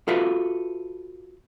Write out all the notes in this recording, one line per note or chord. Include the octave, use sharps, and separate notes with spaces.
F4 F#4 A4 B4 E5